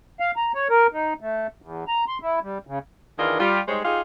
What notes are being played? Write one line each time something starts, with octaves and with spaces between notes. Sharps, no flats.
F5
A#5
C#5
A#4
D#4
A3
E2
A#5
C6
E4
G3
C#3
D#3 E3 D4 F4 G#4 A#4
G3 F4
G3 G#3 D#4 C5 C#5
D#4 F4 G4 G#4